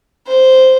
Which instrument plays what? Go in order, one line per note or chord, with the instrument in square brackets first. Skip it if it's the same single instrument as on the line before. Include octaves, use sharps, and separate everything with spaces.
[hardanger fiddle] C5